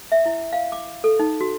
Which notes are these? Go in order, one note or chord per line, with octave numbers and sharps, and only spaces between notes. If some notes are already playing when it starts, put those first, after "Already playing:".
E5
E4
F5
D6
A4
D#4
F#4